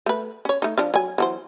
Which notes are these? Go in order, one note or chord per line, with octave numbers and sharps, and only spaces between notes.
A3 B4
C#4 C#5
A3 D#4
F3 D4 F5
F#3 G#5
E3 F#3 C5